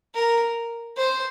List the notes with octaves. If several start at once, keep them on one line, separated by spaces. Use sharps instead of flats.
A#4
C5